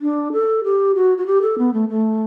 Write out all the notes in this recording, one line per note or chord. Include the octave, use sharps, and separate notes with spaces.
D4
A4
G4
F#4
F#4
G4
A4
B3
A3
A3